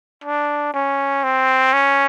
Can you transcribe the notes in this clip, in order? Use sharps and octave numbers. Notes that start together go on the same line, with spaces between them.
D4
C#4
C4
C#4